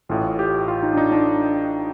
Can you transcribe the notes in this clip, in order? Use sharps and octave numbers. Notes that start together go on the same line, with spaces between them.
A1 A2 F4
G4
F4
D#4
D4
D#4
D4